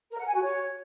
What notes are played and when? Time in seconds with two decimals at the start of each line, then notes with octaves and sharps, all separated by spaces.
0.11 A#4
0.18 F#5
0.26 G#5
0.34 F#4
0.42 C#5